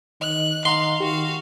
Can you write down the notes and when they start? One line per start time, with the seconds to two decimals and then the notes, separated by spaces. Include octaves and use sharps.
0.21 D#3 D#5 F#6
0.65 D#3 D#5 F5 F#5 A#5 C6
1.00 D#3 F#4 G4 F5